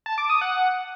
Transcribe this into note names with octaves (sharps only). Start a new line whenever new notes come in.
A5
D6
D#6
F#5